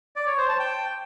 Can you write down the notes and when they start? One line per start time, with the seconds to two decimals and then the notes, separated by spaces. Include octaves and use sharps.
0.16 D5
0.27 C#5
0.38 C5
0.49 A5
0.59 G5